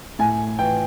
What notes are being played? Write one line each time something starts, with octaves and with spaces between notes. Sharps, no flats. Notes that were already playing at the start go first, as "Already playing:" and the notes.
A2 G#5
E3 G5